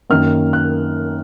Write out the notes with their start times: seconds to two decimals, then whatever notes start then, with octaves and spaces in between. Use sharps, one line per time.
0.09 F#2 D#3 A#3 F6
0.53 F#6